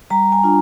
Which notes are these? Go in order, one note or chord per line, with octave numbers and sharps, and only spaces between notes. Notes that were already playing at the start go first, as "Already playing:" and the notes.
G3 A#5
G#5
D4 F4